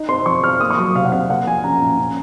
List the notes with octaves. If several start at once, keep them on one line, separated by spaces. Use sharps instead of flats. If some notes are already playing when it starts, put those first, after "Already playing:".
Already playing: D#4
C4 C6
F3 C#6
F3 F6
A#3 D#6
C#6
F#3 D#6
C3 F5
F#5
C3 F5
A#3 F#5
F3 G#5
C#4 A#5
A#2
C#4